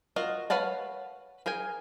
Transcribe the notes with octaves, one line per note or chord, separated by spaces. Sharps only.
F4 F#4 A#4 D#5
B4 C#5 F5 F#5 A5
G#4 A#4 G5 G#5